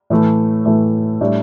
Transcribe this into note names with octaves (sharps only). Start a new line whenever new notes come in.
A2 E3 A3
A2 E3 A3
A2 G3 D4